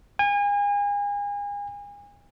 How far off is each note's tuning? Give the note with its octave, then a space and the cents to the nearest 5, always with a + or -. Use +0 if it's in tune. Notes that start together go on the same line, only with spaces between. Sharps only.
G#5 -35